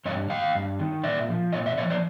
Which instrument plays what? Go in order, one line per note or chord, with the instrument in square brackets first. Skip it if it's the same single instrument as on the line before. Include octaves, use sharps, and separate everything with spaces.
[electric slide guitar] G2 C#5 D#5
D#3 D#5 F5
G2
D#3
A#2 D5 E5
F3
A#2 C#5 D#5
D5 E5
F3 C#5 D#5
C5 D5